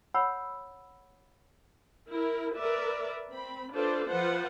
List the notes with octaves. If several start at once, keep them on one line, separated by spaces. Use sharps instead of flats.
C#5 F#5 B5 E6
E4 A#4
A#4 B4 D5 E5
C4 B5
D4 F4 A4 B4 C5 D5
F3 F4 B4 C5 F#5